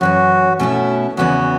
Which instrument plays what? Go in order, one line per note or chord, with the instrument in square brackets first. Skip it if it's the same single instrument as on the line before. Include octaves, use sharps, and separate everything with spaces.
[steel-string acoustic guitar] F#2 E3 C#4 [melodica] F#4
[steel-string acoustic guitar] B2 A3 E4 [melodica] C#4
[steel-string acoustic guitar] E2 C#3 E3 B3 [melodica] F#4